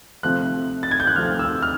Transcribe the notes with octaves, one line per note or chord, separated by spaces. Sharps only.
C3 F3 A3 C4 F#6
A6
G#6
G6
F#6
C3 F3 A3 C4 F6
E6
F6